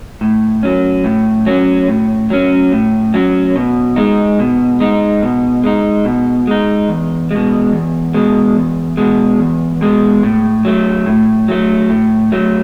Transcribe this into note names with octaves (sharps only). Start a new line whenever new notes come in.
A2
F#3 C#4
A2
F#3 C#4
A2
F#3 C#4
A2
F#3 C#4
B2
G#3 D#4
B2
G#3 D#4
B2
G#3 D#4
B2
G#3 D#4
E2
B2 G#3
E2
B2 G#3
E2
B2 G#3
E2
B2 G#3
A2
F#3 A3
A2
F#3 A3
A2
F#3 A3